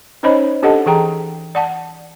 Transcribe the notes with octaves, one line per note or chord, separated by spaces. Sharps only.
C#4 D#4 C5 C#5 D#5 B5
D4 G4 A4 D#5 F#5 A5
E3 G#4 G5 A#5
D5 F#5 A5